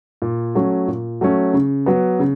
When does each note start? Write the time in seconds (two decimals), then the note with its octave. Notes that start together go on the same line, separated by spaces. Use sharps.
0.22 A#2
0.55 F#3 A3 C#4
0.88 A#2
1.21 F#3 A3 C#4
1.54 C#3
1.86 F#3 B3
2.19 C#3